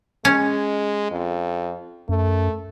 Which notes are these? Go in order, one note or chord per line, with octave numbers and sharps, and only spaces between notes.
G#3 C#4
F2
F#2 A3